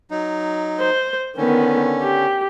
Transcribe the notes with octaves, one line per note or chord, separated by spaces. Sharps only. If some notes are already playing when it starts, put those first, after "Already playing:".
F#3 D#4
C5
D3 D#3 B3 C#4
G4